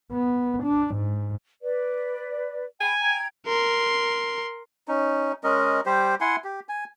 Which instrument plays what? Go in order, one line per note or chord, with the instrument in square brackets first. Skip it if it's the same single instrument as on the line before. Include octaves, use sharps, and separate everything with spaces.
[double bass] B3
D4
G#2
[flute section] B4 D5
[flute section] G5 B5 [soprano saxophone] G#5
[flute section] G5 A#5 G#6
[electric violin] A#4 C6
[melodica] C#4 D#4
G#3 C#4 A#4 D#5
G3 G4 C5
E4 F#5 G#5 C6
G4
G#5